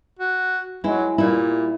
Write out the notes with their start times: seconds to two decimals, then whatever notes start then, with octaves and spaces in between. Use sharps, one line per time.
0.19 F#4
0.84 F#3 G#3 E4
1.18 A#2 G3 E4